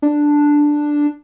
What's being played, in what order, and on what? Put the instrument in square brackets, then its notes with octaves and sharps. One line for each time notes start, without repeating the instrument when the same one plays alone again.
[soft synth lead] D4